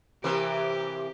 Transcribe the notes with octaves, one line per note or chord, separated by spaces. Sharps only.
C3 E3 A#3 G4